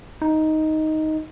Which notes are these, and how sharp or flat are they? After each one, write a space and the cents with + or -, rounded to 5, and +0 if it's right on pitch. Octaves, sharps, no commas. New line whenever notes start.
D#4 +5